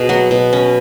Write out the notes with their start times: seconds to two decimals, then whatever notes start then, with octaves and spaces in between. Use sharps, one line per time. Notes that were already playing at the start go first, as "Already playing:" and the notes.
Already playing: B2 G#4
0.09 F#3 F#4
0.31 B2
0.53 C#4